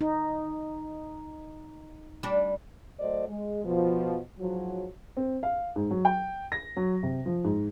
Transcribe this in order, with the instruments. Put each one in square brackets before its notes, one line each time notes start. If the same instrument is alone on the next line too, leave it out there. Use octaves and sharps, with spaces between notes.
[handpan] D#4
[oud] G3 D4
[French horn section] F#3 A3 C5 D5 D#5
G#3
B2 F3
G#2 F3 F#3
[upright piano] C4
F5
G#2
F#3
G5
A#6
F#3
C3
F3
G#2